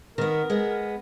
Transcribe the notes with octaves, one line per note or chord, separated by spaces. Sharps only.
D#3 B3 A#4
G#3 B3